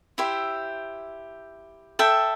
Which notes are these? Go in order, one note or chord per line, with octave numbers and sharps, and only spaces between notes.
E4 G4 C5 E5
A4 E5 G5